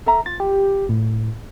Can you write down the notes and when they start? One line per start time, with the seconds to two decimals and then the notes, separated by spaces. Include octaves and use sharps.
0.06 A4 E5 A#5
0.26 F4 A6
0.40 G4
0.89 A2